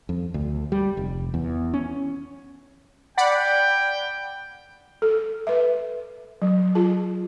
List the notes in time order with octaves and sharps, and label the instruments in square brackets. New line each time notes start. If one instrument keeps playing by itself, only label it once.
[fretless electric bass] F2
D2
G3
F1
E2
C#4
[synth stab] D5 F#5 B5 [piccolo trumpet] G5
[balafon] A4
B4 E5
F#3
F4 G#4 A5